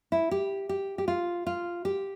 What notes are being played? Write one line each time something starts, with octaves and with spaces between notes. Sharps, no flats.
E4
G4
G4
G4
F4
F4
G4